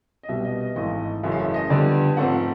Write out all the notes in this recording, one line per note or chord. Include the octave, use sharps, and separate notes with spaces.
D#5
C2 B2 G3 B3 E5
D#5
D#5
G#1 G#2 E3 A3 D#5
F#1 F#2 C#3 E3 A3 E5
F5
E5
D#5
F2 D3 G3 B3 D5
G#2 F3 A3 C4 F#5
F#5